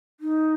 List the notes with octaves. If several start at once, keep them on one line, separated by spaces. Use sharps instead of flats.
D#4